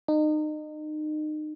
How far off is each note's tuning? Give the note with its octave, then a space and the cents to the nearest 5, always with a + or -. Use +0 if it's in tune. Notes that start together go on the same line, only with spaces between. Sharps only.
D#4 -30